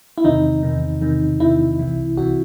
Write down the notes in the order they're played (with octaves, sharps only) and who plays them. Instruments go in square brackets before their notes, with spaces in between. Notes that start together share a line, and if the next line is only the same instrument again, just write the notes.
[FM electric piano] E4
E2 C3 D#3 D#4
E2 C3 D#3
E2 C3 D#3
E2 C3 D#3 E4
C2 C3 E3
C2 C3 E3 F#4